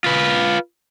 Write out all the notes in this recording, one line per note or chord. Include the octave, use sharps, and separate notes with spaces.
F4 B4